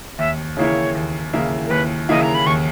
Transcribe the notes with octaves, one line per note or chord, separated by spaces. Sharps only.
D#2 E5
C#3 E3 A#3 E4 C#5
D#2
C#3 E3 A#3 E4
A#4
D#2 B4
C#3 E3 A#3 E4 D#5
A#5
B5
D#2 C#6